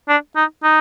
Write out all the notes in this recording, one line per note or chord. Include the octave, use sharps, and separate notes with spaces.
D4
D#4
D#4